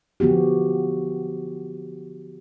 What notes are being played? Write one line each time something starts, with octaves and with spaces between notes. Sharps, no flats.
D3 F3 B3 F#4 G4